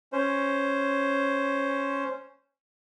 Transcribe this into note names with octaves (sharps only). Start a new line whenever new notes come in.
C#4 C5